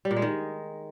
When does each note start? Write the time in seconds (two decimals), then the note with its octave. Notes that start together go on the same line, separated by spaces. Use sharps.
0.05 G3
0.11 A#2
0.16 G#3
0.22 D#3